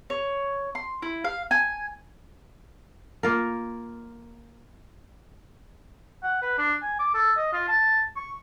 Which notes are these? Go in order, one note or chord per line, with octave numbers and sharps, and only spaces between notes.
C#5
C6
E4
F5
G#5
A#3 F4 A#4
F#5
B4
D4
G#5
D6
A4
D#5
F4
A5
C#6